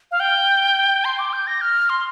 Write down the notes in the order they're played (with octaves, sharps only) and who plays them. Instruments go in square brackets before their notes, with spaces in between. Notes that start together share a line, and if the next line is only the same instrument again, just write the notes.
[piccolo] F5
G5
C6
D6
G6
A#6
F6
C6